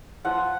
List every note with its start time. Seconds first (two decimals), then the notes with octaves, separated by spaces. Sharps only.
0.25 F3 F#5